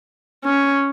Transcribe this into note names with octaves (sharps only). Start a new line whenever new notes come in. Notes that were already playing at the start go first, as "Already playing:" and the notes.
C#4